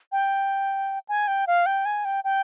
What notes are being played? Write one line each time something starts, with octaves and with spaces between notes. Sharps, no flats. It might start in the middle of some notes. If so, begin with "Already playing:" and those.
G5
G#5
G5
F5
G5
G#5
G5
G5